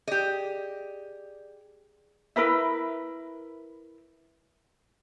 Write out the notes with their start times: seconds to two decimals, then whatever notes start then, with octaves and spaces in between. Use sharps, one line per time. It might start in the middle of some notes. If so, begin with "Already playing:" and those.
0.08 G4 G#4 D5 D#5
2.36 E4 A#4 B4 E5